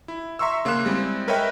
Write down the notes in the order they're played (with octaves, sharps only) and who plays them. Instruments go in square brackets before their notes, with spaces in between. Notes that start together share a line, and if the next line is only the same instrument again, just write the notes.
[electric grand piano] E4
E5 A#5 C6 C#6 E6
C#3 A#3 F5 C6 F#6 E7
G3 G#3 C4 E4
A#4 B4 C#5 D#5 E5 G5